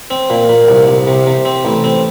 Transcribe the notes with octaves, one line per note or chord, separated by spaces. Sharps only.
C4
A#2
A#2
C2
C2
C3
C3
C4
A1
C4